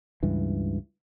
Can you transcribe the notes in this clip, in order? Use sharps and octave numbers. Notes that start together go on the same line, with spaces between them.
C#2 G2 E3